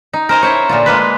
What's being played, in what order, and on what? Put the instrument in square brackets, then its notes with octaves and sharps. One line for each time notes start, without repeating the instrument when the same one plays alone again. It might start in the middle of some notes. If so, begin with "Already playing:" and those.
[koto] D#4
A#4 C5 D#5 G#5
E4 C5 C#5
A#2 D3 F4
G#3 A#3 B4